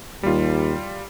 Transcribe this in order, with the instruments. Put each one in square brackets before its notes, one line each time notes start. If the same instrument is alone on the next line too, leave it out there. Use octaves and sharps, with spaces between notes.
[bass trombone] D#2 [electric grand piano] G3 F4